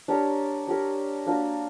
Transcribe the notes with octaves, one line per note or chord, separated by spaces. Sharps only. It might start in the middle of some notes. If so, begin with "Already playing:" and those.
D4 G4 A#4 C#5
D4 G4 A#4 C#5
A#3 D4 F#4